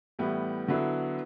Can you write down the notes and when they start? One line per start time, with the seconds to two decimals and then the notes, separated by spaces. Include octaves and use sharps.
0.19 A2 E3 G3 B3
0.68 D3 F#3 B3 E4